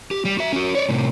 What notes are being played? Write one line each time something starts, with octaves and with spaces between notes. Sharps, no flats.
G4
G3
F#4 E5
C#4 F#4
C#5 D5
A2 C3